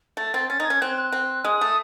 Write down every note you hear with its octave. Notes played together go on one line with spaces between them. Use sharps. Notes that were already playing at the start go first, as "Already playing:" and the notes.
A3 A6
C4 A6
C#4 A6
D#4
G#6
C#4
C4 F#6
F#6
C4
G#3 D#6
A3